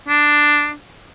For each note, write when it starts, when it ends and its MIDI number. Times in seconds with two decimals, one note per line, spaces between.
0.08 0.73 62